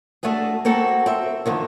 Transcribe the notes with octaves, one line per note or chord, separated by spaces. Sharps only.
A3 D4 F#4 G#4
A#3 C4 F#4 A4
C4 E5
F2 D3 D#3